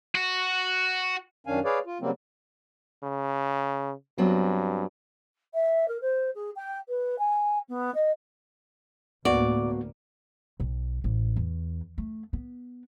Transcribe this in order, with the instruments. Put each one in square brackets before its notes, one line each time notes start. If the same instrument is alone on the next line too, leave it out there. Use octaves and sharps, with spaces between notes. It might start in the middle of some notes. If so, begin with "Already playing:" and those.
[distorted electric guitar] F#4
[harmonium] F#2 D#3 C#4 D4 F5 G#5
G#4 B4 C#5 D5 F5
F4
C#3 F#3 G3 A#3 C4
[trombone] C#3
[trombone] G2 [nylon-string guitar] F#3 B3 C4
[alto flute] E5
A#4
C5
G#4
G5
B4
G#5
B3
D#5
[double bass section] D2 A2 A#3 [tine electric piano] B3 F#4 [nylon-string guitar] D5
[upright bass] B1
A1
E2
A3
B3